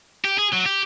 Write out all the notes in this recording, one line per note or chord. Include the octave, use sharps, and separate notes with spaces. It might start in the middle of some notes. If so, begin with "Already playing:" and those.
G4
G#4
F#3
G4